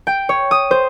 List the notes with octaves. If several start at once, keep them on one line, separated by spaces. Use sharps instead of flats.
G5
C#5
D#6
C5